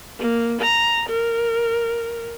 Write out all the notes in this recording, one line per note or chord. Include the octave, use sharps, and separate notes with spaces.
A#3
A#5
A#4